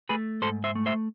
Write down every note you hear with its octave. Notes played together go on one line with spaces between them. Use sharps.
A3 G#4 B4
G#2 A4 C5
C5 E5
A3
C5 E5